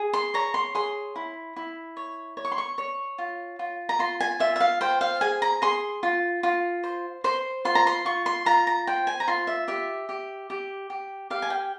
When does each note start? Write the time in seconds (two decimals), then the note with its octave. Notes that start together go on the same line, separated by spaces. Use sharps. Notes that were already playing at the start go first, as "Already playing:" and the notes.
Already playing: G#4
0.13 C6
0.34 C#5 A#5
0.54 C6
0.75 G#4 C6
1.16 E4
1.56 E4
1.97 C#5
2.37 C#5
2.45 C#6
2.52 C6
2.58 C#6
2.78 C#5
3.18 F4
3.59 F4
3.89 A#5
3.99 F4 C6
4.20 G#5
4.40 F4 E5
4.56 E5
4.60 F5
4.81 C5 G5
5.01 F5
5.21 G#4 G#5
5.42 A#5
5.62 G#4 C6
6.03 F4
6.43 F4
6.84 C5
7.24 C5 C6
7.65 F4 C6
7.75 A#5
7.87 C6
8.05 F4 C#6
8.26 C6
8.46 F4 A#5
8.67 A#5
8.87 C5 G5
9.07 G#5
9.20 A#5
9.27 F4 C6
9.47 E5
9.68 G4 E5
10.09 G4
10.50 G4
10.90 G4
11.30 G4 F5
11.42 G#5
11.50 G5